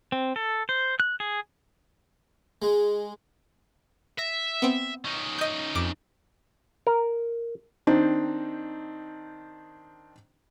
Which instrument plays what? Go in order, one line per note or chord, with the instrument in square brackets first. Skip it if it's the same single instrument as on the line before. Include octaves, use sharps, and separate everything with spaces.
[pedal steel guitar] C4
A4
C5
F#6
G#4
[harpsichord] G#3
[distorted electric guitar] E5 [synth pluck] A#6
[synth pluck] B3 C4
[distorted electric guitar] C#4 D#4
[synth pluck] D#5 G6
F2 D6 D7
[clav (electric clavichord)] A#4
[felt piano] D#3 C4 D4 D#4